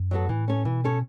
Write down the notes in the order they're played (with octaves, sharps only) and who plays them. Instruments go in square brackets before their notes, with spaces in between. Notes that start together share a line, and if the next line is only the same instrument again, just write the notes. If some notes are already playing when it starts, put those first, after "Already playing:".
Already playing: [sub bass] F#2
[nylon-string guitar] F#3 B3 F#4 A4
[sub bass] A2 [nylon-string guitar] E3
[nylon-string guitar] C#4 A4 C#5
[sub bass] B2 [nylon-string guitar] E3
[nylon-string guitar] C#4 A4 C#5